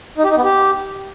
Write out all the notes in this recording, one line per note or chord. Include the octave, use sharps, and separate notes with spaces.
D#4
G4
D#4
B3
G4